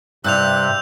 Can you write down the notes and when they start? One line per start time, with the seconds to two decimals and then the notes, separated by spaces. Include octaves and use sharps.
0.24 G2 C3 E6 F#6 G6 F7